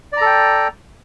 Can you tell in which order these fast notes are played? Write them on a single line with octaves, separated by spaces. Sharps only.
D5 A#5 A4 G5